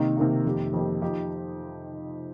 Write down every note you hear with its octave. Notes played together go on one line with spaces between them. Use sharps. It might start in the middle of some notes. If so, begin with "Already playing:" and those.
Already playing: C3 D#3 A#3 D#4
C3 D#3 A#3 D#4
F2 D#3 A#3 G4
F2 D#3 A#3 G4
F3 D#4 G4